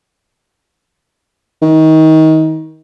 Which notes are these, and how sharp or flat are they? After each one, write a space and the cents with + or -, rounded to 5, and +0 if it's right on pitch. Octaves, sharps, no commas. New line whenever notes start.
D#3 +25